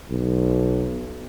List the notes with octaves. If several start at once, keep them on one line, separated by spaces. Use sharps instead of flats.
B1